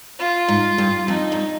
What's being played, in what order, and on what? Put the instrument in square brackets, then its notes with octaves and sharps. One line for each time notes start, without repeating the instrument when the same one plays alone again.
[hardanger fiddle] F4
[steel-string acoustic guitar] G#2
G2
[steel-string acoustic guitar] F2 [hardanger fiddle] D#4
[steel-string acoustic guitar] G2